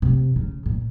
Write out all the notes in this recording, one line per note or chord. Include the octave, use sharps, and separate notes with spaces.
C3
C#3
A#2